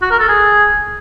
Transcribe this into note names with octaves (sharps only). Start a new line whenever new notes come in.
F#4
A#4
A4
G#4